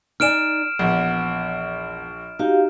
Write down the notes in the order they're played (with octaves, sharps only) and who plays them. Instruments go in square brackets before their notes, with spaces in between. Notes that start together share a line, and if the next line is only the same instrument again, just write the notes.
[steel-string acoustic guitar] D#4 D5 G#5 [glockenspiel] F6 D7 E7
[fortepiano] A#1 [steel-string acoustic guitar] E2 F#5
[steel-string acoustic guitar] D#4 [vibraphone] F#4 G4 F5